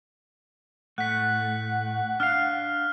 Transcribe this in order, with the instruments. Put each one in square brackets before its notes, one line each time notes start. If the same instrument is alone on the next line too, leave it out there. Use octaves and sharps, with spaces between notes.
[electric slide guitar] A2 A3 [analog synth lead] F#5 [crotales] F#6 B6
[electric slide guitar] D4 F5 [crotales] F6